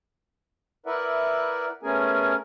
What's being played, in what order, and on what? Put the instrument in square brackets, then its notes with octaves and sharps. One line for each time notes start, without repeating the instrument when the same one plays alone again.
[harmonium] E4 A#4 B4 D5 E5 F#5
A3 B3 C#4 G#4 A#4 G#5